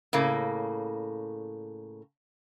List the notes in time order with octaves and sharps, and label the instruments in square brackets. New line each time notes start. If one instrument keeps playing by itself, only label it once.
[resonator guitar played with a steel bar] A2 C#3 A#3